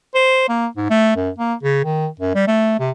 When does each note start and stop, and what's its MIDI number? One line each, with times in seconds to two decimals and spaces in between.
0.15 0.45 72
0.49 0.67 58
0.77 0.87 44
0.90 1.15 57
1.16 1.30 42
1.38 1.54 58
1.63 1.80 49
1.84 2.07 51
2.20 2.34 42
2.35 2.45 55
2.48 2.75 57
2.79 2.90 48